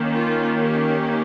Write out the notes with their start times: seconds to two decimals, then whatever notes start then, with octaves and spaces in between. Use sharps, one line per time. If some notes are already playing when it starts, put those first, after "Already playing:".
Already playing: D#3 A#3 C#4
0.14 F4
0.60 G4